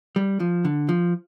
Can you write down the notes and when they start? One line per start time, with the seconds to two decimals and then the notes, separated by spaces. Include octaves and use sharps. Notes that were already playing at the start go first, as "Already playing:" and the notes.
0.16 G3
0.40 F3
0.65 D3
0.89 F3